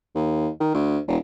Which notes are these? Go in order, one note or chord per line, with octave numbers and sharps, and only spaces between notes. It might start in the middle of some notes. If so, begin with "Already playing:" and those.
D#2
D#3
D2
E1